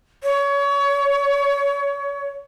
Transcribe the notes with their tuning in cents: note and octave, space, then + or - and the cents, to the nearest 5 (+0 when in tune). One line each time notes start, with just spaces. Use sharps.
C#5 +25